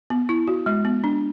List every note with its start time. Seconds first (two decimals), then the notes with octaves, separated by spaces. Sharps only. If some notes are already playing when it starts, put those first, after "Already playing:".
0.10 B3
0.29 E4
0.48 F#4
0.66 G#3
0.85 B3
1.04 D4